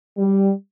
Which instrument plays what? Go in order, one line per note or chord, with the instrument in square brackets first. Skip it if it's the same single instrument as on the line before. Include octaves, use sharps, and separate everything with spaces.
[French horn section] G3